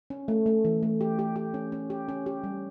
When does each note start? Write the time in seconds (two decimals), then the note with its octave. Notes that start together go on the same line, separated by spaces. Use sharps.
0.10 C#4
0.28 A3
0.46 A3
0.65 E3
0.83 A3
1.01 G4
1.19 G4
1.36 G4
1.54 C#4
1.72 C#4
1.90 G4
2.09 C#4
2.26 G4
2.44 G3